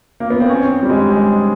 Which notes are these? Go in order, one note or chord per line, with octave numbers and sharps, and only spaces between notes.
A#3
B3
C4
C#4
C4
G3
G#3
G#3